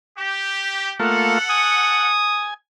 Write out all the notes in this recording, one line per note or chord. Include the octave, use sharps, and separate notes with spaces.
G4
A3 A#3 F4 A4 F#5
G#5 D#6